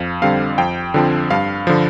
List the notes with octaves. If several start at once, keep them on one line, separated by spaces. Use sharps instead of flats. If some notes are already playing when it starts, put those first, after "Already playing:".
Already playing: F2 F5
D3 G3 C4 F5
F2 G5
D3 F3 C4
G2 F5
D3 F3